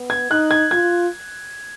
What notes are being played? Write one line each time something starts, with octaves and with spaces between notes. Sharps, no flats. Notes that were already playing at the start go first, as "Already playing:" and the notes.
Already playing: B3
G#6
D#4 F#6
G#6
F4 G#6